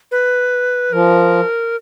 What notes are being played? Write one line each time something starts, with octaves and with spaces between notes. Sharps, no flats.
B4
F3 A#4